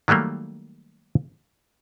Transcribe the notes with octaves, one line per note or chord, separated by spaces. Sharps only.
D#3 F#3 G3 A3 A#3